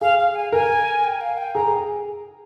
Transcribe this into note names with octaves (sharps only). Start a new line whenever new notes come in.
G#4 F5
F5
G#5
A#4 G#5
G5
F5
G5
G#4 A#5
G#4